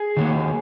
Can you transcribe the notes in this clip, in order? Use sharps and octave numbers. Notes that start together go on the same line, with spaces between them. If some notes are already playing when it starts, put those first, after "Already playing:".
Already playing: G#4
D#3 F#3 A#3